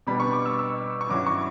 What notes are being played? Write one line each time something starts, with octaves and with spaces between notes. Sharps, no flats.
B2 G3 B3 D4 B5
C#6
D6
E6
E6
C#6
G2 F#3 C#4 E4 D6
C#6